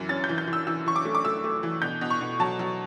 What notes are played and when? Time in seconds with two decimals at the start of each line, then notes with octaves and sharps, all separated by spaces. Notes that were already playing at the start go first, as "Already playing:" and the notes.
Already playing: F#2 E3
0.09 C#4 A6
0.24 G6
0.29 E3
0.38 G6
0.47 E3
0.53 E6
0.67 E3 E6
0.86 E3 C#6
0.96 D6
1.05 A3
1.15 D6
1.25 A3 E6
1.44 A3
1.63 E3
1.82 B2 G6
2.01 B2
2.10 C#6
2.21 B2
2.40 F#3 A5
2.59 F#3